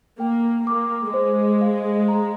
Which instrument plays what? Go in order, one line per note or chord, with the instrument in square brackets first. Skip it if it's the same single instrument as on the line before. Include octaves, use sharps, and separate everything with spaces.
[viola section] A#3 [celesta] G5
[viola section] A#3 [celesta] D6
[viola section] G#3 [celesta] C5
[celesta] F5
A#5